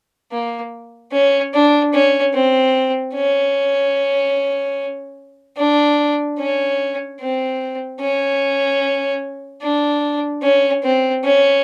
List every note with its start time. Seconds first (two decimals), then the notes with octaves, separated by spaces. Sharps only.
0.32 A#3
1.12 C#4
1.54 D4
1.93 C#4
2.34 C4
3.15 C#4
5.57 D4
6.39 C#4
7.20 C4
8.00 C#4
9.62 D4
10.43 C#4
10.83 C4
11.24 C#4